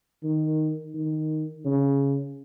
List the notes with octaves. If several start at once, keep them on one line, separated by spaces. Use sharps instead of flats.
D#3
D#3
C#3